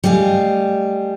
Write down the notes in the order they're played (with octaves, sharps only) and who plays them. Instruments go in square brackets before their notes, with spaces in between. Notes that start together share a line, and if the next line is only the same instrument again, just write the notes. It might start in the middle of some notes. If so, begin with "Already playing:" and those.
[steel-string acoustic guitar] G3 A3 D#5 F5 G#5